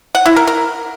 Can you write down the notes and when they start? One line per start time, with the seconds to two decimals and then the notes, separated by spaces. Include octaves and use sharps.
0.15 F#5
0.26 E4
0.36 A#4
0.47 A#4